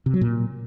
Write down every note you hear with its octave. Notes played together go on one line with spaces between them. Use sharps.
C3
F#3
A#2